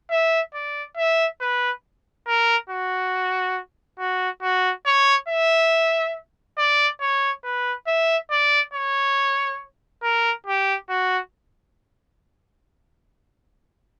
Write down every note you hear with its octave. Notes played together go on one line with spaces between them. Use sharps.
E5
D5
E5
B4
A#4
F#4
F#4
F#4
C#5
E5
D5
C#5
B4
E5
D5
C#5
A#4
G4
F#4